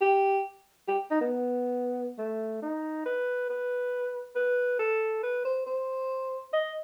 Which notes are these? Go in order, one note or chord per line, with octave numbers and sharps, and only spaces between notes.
G4
G4
D#4
B3
A3
D#4
B4
B4
B4
A4
B4
C5
C5
D#5